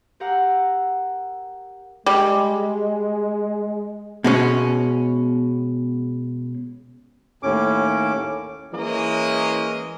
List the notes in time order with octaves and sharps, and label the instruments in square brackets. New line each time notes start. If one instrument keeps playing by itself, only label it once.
[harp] G4 A#4 F5 F#5 A#5 E6
[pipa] G3 [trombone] G#3
[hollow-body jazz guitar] B2 G#3 C#4
[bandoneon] D#2 A2 C#4 D6
[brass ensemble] E3 G#3 A#3 C#4 D#5